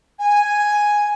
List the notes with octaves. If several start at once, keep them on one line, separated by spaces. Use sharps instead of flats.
G#5